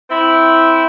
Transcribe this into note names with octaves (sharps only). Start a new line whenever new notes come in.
C4 E4